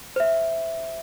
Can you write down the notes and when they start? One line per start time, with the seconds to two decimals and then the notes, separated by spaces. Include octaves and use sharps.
0.16 C5 E5